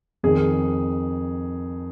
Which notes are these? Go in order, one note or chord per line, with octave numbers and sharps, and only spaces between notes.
F2 D#3 G#4